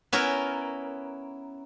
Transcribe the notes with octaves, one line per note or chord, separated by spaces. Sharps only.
B3 C#4 E4 A#4